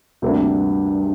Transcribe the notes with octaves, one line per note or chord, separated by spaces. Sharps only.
D2 G2 C3 A#3 D4